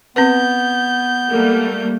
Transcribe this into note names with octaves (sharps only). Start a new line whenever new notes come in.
B3 C4 B4 G6
G3 A3 A#3